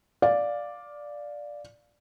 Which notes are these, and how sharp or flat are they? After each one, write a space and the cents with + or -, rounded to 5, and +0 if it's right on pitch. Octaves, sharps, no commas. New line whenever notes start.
D5 +0 F5 +10